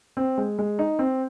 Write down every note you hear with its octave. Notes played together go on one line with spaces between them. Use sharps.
C4
G#3
G#3
D#4
C4